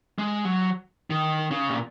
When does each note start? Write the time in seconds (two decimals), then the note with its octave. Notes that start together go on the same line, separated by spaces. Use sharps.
0.19 G#3
0.45 F#3
1.10 D#3
1.51 C#3
1.69 A#2